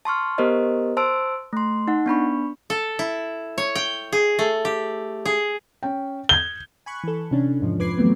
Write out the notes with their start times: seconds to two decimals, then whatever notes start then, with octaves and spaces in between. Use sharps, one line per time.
0.05 A5 C6 C#6 F6
0.38 B3 G4 A#4 C5 D#5
0.97 C5 A5 C6 E6 D7
1.53 A3 C6
1.88 D#4 F#5
2.06 B3 D4 B5 C#6
2.70 A4
2.99 E4
3.58 C#5
3.75 G5
4.12 G#4
4.39 A3
4.65 G4
5.25 G#4
5.83 C#4 G5
6.29 G6 G#6 G7
6.86 G#5 B5 C#6 F#6
7.04 E3 A4
7.31 C3 C#4 D4
7.60 E2 G#2 F3
7.79 F2 F3 B4 D6 G#6 C7
7.98 E3 F#3 A3 B3 C4